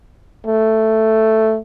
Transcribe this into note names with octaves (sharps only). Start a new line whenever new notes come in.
A3